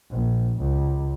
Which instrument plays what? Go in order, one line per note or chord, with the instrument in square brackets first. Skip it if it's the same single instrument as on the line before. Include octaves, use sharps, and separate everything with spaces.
[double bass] A#1
C#2